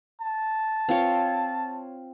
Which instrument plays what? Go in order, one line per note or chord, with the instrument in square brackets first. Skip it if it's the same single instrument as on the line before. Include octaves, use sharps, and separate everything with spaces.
[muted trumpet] A5
[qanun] C4 F4 C#5